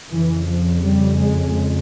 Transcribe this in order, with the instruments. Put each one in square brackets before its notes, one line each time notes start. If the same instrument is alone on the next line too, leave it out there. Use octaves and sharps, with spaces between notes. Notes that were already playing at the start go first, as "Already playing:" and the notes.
[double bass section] F2 C#3 E3
F3
G3
G#3